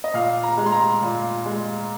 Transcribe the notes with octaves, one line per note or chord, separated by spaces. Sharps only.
D#5
A#2 F5
A#5
G#3
C6
A#5
A#2
G#3